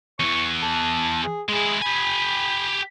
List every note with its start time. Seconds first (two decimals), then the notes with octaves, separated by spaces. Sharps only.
0.20 E2 E3 C#6
0.62 A5
1.24 G#4
1.49 G#3 E4 G#4
1.82 G4 G#5 B5